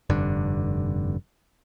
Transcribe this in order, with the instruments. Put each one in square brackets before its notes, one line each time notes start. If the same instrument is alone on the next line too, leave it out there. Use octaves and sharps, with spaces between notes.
[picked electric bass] F1 G2 D3